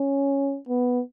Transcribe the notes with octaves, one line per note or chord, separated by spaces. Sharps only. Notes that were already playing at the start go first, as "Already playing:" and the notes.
Already playing: C#4
B3